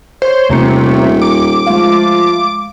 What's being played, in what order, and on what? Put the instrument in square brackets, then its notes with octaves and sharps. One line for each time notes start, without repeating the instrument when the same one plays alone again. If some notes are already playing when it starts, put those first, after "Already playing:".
[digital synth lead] C5 [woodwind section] C#5
[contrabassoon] D#1 [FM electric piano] E2 A#5 C#7 [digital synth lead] C3 [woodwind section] A3
[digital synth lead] D6
[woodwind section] F3 A3 F4 [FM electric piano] G#3 F5